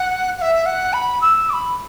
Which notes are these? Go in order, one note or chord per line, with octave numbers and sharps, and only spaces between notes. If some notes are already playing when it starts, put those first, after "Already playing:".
Already playing: F#5
F#5
E5
F#5
B5
E6
D6
B5